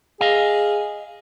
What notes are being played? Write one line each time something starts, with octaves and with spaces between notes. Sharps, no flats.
G#4 D#5 F5